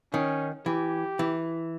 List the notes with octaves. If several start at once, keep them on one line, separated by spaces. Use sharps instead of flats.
D#3 C#4
E3 G4
E3